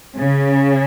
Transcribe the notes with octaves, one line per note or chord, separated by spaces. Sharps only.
C#3